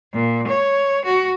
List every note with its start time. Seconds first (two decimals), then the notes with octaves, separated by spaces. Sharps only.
0.14 A#2
0.47 C#5
1.05 F#4